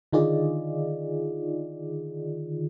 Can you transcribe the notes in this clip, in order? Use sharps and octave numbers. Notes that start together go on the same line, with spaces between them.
D3 D#3 D#4 F4 G#4 D5